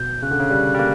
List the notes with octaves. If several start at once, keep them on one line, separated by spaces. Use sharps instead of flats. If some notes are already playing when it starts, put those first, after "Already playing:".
Already playing: B2 G6
C#3 F#6
D3
C#3
G3
G3
A#3